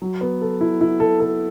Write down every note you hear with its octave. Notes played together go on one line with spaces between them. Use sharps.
F#3
B3
A4
E4
E4
A4
A4